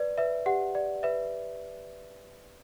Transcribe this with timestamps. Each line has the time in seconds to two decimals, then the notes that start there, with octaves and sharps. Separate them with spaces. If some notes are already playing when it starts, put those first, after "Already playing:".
Already playing: B4 D5
0.18 B4 E5
0.46 G4 F#5
0.75 D5
1.03 B4 E5